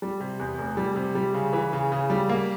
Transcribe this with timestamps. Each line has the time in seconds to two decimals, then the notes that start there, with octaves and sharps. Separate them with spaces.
0.02 G3
0.20 C3
0.40 E2
0.58 F1
0.77 G3
0.96 C3
1.15 G3
1.34 C#3
1.53 E3
1.73 C#3
1.92 C#3
2.10 G3
2.29 A#3